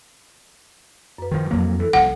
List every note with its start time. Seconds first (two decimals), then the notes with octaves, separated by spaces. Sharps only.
1.18 F#2 B4
1.31 D#3 F3
1.51 F2 F#3 A#3
1.80 E3 A4
1.93 C2 F3 F#5